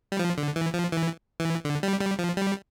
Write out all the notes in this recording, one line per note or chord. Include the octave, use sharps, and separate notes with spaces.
G3
F3
D3
E3
F3
E3
E3
D3
G3
G3
F3
G3